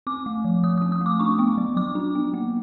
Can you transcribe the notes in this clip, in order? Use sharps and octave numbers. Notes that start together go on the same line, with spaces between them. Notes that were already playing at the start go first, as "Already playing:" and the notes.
C4 D6
A3
F3
F3 D#6
D#6
C4
D#6
A3
D6
D4 C#6
B3
F#3
F#3 D6
D4
B3
A#3